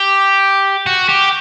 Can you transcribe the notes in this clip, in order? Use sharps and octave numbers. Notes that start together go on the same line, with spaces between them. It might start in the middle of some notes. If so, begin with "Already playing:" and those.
Already playing: G4
F#4
G4